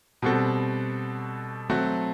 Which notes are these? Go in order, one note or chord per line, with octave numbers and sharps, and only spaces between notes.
B2 G3 C4 F#4 A4
F#3 A3 C4 F#4